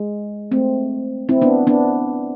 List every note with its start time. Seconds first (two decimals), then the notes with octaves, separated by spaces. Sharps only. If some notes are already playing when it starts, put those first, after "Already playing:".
Already playing: G#3
0.51 A3 C4
1.29 C4 E4
1.42 B3 D4
1.67 B3 D4